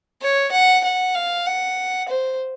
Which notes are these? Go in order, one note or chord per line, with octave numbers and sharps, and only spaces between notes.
C#5
F#5
F#5
F5
F#5
C5